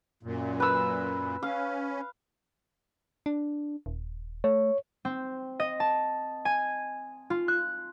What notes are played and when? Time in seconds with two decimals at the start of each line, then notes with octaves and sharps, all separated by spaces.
0.23 F#2 A#2
0.60 B4 E6
1.43 C#4 F5
3.26 D4
3.86 D#1
4.44 A3 C#5
5.05 C4
5.60 D#5
5.80 A5
6.45 G#5
7.30 F4
7.48 F#6